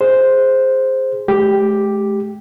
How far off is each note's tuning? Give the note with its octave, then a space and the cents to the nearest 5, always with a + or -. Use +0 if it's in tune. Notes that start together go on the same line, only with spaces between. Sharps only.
G#4 +0 C5 +0
G#3 +45 G4 +0